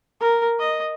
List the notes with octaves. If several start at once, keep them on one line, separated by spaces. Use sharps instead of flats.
A#4
D#5